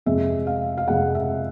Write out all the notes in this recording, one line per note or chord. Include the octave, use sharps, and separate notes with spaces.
F2 C3 F3 G#3 E5
F5
F5
F2 C3 F3 G#3 F#5
E5